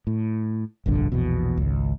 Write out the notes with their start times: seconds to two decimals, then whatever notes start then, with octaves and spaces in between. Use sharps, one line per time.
0.07 A2
0.86 F1 A#1 G2 D3
1.12 A#1 E2 B2
1.57 G#1 C#2